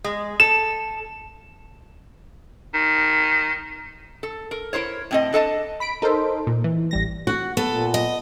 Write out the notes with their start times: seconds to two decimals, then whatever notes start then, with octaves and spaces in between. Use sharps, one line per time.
0.04 G#3
0.40 A4 E7
2.74 D#3
4.23 A4
4.51 A#4
4.73 E4 A#4 C5 C#5
5.11 A2 C4 D#5
5.33 D4 A4 D#5 A5
5.80 B5 B6 D7
6.02 D#4 A4 A#4 C5
6.47 A#2
6.64 E3
6.91 A1 G3 A#6
7.27 F#4
7.57 B3 A4
7.69 A#2
7.94 D#5